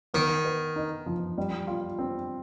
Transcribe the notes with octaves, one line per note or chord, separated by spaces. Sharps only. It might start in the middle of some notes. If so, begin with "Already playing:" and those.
D#3 B3
B4
D#4
F3
G3
F4
C4